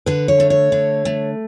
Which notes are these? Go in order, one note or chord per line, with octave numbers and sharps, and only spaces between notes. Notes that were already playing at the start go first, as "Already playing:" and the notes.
D3 B4
C#5
A3
C#5
D3
A3